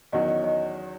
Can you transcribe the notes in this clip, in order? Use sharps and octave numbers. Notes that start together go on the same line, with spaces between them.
E2 D#3 F#3 C#4 F#4 D#5
D#5
D#5